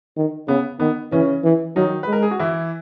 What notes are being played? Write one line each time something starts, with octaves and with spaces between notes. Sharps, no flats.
D#3
C#3 B3
D#3 B3
C#3 E3 C#4
E3
D#3 F#3 D#4
B4
G#3
A#4
G#4
F#4
E3 E4